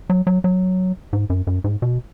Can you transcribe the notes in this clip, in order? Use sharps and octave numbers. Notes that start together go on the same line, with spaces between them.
F#3
F#3
F#3
G#2
F#2
F#2
G#2
B2